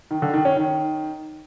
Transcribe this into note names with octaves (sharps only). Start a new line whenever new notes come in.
D#3
D3
D#3
C#4
D#3